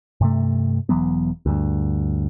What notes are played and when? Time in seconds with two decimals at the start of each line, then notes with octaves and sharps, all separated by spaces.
0.21 G2 C3 A3
0.89 E1 E3 F#3 B3
1.46 D2 G2